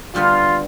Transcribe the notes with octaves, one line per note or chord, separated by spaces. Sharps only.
D3 G3 B3 F4